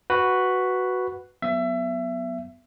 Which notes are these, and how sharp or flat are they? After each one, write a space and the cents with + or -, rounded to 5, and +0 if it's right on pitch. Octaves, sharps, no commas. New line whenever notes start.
F#4 +0 B4 +0 B5 +0
F#3 -5 B3 +0 E5 +25